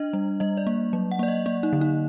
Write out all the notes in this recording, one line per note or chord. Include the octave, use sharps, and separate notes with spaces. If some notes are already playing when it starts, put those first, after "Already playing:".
Already playing: D4 D#5
G3
G3 D#5
D5
A#3
F#3
F#5
A#3 D5
D#5
A#3 D5
D#4
D3
D#4